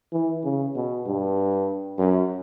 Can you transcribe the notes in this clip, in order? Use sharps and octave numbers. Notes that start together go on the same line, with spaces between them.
E3
C#3
B2
G2
F#2